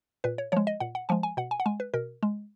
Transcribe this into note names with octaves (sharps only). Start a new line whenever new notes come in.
A#2 B4
C#5
F3 G#3 C#5
D#5
A#2 F#5
F#5
F3 G#3 G#5
G#5
B2 F#5
G#5
F#5
G#3 G#5
B4
B2 A#4
G#3